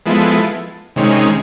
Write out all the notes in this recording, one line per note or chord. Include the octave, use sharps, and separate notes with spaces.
F3 G#3 B3 E4 A4
C3 D#3 G#3 C#4